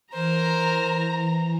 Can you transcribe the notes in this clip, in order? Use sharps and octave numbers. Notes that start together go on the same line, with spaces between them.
E3 A#4 C5 A#5